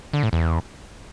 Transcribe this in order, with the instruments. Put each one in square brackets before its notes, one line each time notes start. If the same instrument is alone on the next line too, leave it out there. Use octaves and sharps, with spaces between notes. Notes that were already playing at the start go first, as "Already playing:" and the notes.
[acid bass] D3
A2
E2